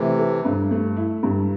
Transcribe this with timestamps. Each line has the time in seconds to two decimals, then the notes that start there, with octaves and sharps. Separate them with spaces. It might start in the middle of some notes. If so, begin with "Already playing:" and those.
Already playing: C3 E3 A3
0.18 A4
0.45 G2
0.71 A3
0.97 E4
1.23 G2